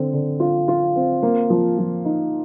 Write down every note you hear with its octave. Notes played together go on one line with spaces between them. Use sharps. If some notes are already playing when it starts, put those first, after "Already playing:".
Already playing: D3 C4
D3
F4
F4
C4
A#3
F3
F3
D#4